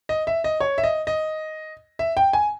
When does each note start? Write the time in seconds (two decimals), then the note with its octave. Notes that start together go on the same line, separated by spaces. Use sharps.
0.09 D#5
0.27 E5
0.44 D#5
0.60 C#5
0.78 E5
0.84 D#5
1.07 D#5
1.99 E5
2.17 G5
2.33 G#5